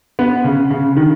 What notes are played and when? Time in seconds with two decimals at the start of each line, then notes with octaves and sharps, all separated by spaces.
0.19 B3
0.44 C#3
0.70 C#3
0.97 D#3